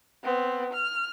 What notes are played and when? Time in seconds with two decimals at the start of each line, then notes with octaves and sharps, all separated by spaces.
0.24 B3 C4
0.73 F6